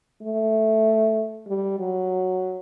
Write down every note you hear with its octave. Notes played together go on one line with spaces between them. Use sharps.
A3
G3
F#3